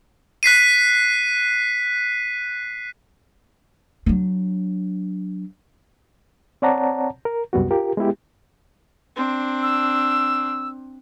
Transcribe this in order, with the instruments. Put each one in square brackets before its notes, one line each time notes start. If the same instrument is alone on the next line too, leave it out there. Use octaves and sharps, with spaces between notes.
[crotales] F#6 B6 C7 D#7
[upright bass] F#3 D4
[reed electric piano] C4 C#5 D5 F#5 A5 A#5
A#4
C2 F#2 G3 B3 F#4
F4 G4 A#4
G#3 B3 E4 G4
[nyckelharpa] C4 D4
[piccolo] E6